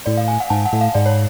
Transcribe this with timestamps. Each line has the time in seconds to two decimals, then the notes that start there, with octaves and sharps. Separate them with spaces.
0.06 A2 D5
0.17 F5
0.28 G#5
0.40 F#5
0.50 G#2 A5
0.65 F#5
0.73 A2
0.81 F5
0.95 G#2 D5
1.06 C#5